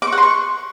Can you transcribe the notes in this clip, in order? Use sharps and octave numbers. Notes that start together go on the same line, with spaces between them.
D6
C#6
F#5
C6
C#6